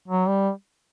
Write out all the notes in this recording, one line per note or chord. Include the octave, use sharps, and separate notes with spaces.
F#3
G3